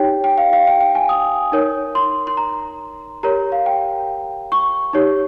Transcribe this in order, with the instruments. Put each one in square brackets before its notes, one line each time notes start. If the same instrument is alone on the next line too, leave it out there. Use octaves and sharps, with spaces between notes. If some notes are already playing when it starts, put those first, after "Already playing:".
Already playing: [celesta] D#4 G4 C#5 G5
G5
F5
F5
G5
G5
G#5
D#6
D#4 A#4 C#5
C6
C6
A#5
G4 A#4 C#5 A#5
F5
G5
C#6
D#4 G4 C#5